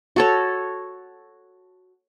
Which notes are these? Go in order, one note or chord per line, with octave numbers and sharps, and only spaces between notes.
F#4 A4 C#5